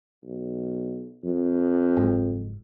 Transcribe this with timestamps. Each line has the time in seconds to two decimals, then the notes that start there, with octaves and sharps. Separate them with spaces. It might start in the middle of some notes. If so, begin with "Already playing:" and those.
0.23 B1
1.24 F2
1.97 F#1 G#2